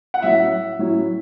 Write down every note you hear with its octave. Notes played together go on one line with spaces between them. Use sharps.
F#5
A2 F#3 C#4 E4 E5
A2 F#3 C#4 E4